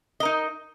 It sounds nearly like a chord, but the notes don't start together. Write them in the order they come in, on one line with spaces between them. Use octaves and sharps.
D#5 A#4 D#4